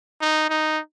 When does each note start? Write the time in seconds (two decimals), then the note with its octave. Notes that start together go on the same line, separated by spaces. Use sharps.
0.21 D#4
0.50 D#4